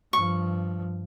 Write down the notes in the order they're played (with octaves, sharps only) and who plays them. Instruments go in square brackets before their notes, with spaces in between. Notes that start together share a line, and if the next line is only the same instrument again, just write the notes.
[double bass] G2 F3 [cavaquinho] C#6